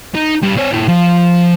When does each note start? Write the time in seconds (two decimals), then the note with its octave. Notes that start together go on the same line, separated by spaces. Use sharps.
0.15 D#4
0.43 G2
0.57 C4 C#5
0.72 A#2 E4
0.88 F3